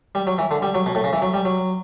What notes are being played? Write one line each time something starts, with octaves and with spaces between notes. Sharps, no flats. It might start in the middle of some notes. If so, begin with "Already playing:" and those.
G3
F#3
E3
D3
G3
F#3
B2
A2
C#3
E3
F#3
G3
F#3